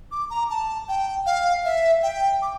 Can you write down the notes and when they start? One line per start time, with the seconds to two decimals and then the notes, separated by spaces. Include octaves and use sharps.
0.11 D6
0.30 A#5
0.50 A5
0.89 G5
1.26 F5
1.65 E5
2.03 G5
2.42 D6